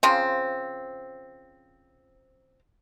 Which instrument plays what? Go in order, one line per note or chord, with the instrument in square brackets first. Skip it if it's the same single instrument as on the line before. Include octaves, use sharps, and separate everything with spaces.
[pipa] C#3 F3 C4